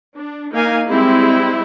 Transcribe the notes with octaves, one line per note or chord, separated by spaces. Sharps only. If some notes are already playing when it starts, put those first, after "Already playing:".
D4
A#3 D#4 F5 G#5
G3 G#3 C4 E4